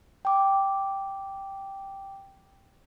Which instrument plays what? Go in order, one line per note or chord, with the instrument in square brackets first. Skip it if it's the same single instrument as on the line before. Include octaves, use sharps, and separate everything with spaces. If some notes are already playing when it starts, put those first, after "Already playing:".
[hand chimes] G5 D6